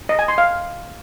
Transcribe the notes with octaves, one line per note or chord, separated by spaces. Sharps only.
D#5
G#5
C6
F5